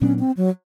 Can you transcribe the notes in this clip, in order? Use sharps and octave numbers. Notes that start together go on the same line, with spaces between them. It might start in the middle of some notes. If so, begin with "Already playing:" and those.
A#2 F#3 B3 C#4 D4
C4
F#3